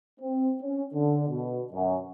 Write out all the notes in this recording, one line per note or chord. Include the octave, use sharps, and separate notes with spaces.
C4
C#4
D3
B2
F#2